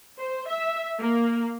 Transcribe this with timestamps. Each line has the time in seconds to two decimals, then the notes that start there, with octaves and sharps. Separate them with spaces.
0.18 C5
0.48 E5
1.00 A#3